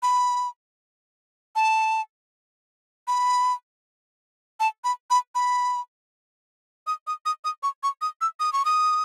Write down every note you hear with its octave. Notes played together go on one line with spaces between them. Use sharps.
B5
A5
B5
A5
B5
B5
B5
D#6
D#6
D#6
D#6
C#6
C#6
D#6
E6
D#6
C#6
D#6